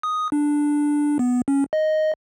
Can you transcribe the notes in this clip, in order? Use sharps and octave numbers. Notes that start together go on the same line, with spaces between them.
D#6
D4
B3
C#4
D#5